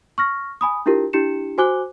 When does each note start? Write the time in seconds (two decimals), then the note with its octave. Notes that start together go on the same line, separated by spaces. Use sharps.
0.18 C#6 F6 A#6
0.61 G#5 B5 D#6
0.86 D4 E4 F4 G4 A#4
1.13 D4 E4 G4 C#7 E7
1.58 F#4 C5 G#5 D6 F#6 G7